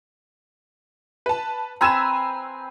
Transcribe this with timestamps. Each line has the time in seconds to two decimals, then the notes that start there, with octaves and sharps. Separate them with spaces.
1.26 B4 A5
1.81 C4 B4 G#5 A#5 E6 E7